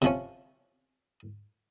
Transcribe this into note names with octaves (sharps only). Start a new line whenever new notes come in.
C3 F3 C#4